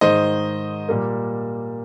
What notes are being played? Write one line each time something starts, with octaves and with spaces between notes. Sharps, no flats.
G#2 D#3 G#3 C5 D#5
A#2 G3 A#3